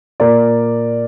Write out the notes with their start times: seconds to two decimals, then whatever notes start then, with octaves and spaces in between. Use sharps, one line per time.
0.20 A#2 A#4 D5